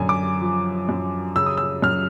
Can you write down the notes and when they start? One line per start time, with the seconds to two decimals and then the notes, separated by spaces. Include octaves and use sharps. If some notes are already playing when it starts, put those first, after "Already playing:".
Already playing: F#2 D3 G#5
0.09 D6
0.41 F3
0.89 F#2
1.36 C#3 E6
1.46 D#6
1.57 E6
1.82 F#2 F6